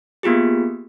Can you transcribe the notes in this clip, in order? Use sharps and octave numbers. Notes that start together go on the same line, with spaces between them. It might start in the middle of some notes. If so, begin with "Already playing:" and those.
A#3 B3 F4 G4 G#4